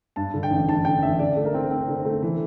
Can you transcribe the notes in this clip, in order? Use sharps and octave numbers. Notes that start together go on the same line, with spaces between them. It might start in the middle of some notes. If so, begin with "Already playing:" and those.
G2 A5
D3
G5
A1
A1 A5
D3 G5
A1 E5
D3 D5
A3
A#4
C4
C4
D3
A3
E3